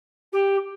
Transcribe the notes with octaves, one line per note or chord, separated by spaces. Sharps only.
G4